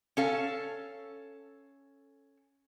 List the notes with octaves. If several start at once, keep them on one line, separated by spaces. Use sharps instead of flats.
C#4 A4 F5